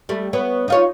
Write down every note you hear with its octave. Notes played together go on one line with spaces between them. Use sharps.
G3 A3
B3 C#5
D#4 F4 C#5